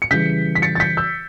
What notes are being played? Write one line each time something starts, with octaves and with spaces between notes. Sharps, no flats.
C#7
C#3 E3 G3 G6 B6
B6
A6 C#7
A6
G6 B6
E6 G6